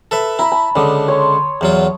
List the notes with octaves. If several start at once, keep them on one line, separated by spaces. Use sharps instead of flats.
A4 B4 E5
E4 A#5 B5
A5
C#2 D3 D#6
C#5 C6
E2 F#3 F4